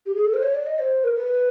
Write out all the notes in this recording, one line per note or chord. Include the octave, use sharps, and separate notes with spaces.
G4
G#4
A4
C5
C#5
D5
D#5
C5
A#4
B4